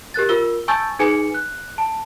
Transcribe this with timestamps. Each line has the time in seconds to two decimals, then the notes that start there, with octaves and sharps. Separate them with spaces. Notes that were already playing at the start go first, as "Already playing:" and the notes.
0.14 G4 A#4 F#6 A6
0.29 F4 A#4 E6 G7
0.68 G#5 A5 C#6 E6 G6 A6
0.99 D#4 G#4 B4 G#5 C#7
1.34 F#6
1.78 A5